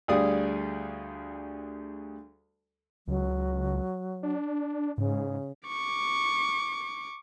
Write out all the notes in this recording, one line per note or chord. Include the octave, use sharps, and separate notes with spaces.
D2 G3 G#4 D5 F5 D#6
C#2 F#3
D4
G#2 C#3
C#6 D6